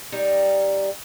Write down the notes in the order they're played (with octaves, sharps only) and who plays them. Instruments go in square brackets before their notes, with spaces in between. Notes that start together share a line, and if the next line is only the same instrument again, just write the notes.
[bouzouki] G3 D#4